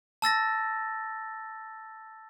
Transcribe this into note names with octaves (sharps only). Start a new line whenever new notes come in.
A5 E6 A6 A#6